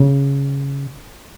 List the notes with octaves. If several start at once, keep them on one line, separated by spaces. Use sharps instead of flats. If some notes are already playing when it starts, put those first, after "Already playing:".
Already playing: C#3